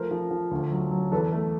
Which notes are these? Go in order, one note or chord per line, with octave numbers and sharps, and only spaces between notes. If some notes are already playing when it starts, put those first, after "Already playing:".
Already playing: F3 A3 A#4 C5
F3
F3
D2
F#3
F#3
E2 A4 B4
A3